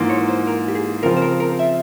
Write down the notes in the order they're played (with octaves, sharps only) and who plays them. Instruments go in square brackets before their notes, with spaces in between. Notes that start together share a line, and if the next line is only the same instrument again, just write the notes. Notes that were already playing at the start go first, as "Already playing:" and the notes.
Already playing: [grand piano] G#2 E3 A#3 F4
[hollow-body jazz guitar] C#5
C5
A#4
G4
G#4
[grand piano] C#3 F3 C4 F4 [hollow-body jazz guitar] A#4
[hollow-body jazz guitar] C5
A#4
A#4
E5